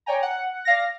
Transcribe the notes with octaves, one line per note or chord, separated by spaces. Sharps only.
C#5 D5 G5 G#5 A#5
F#5
D5 F5 A#6